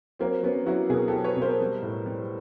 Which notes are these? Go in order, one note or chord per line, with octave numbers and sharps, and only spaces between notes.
F#3 A#3 C4
F#3 B3 C#4
F#3 E4 F#4
B2 G#4 A#4
G4 A4
F#3
B4 C#5
B2
A#4 C5
G3
A2
G3